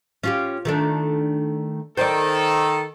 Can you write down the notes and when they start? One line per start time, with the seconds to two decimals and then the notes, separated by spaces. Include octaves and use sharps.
0.24 C#4 F4 G4
0.65 D#3 A3 D4
1.97 D#3 A4 C5 D5